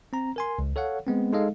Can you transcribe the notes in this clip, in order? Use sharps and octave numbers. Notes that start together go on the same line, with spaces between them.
C4 A#5
A#4 G#5 C6
C#2
A4 C#5 F5 F#5
G#3 B3 C4
G#3 D#4 A4 D#5 F5